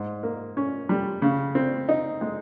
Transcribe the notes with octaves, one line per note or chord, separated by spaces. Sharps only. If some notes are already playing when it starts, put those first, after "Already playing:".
Already playing: G#2
A#3
C#4
G3
C#3
C4
D#4
G#3